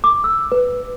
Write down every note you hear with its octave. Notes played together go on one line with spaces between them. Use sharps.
D6
E6
B4